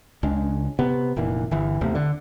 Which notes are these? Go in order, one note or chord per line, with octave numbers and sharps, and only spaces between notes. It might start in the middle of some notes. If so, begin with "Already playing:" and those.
C#2 C#3 G#3 D4
C3 B3
F1 A#2 E3
G1 E3
E1 D#2 C3 A3
D3